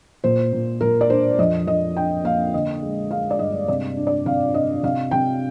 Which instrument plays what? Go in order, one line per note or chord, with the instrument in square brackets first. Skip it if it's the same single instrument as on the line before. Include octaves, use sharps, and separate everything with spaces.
[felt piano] A#2 C5
A#2
A#2 A#4
D5
D4 C5
F2 D#5
F2 D#5
D4 G5
A#3 F5
D3 D#5
G#3
G#3 F5
D5
G2 D#5
C3 D5
D4
D5
C3 F5
D4 D#5
C3 F5
C3 G5